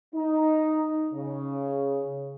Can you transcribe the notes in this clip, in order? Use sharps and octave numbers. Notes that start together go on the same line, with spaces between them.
D#4
C#3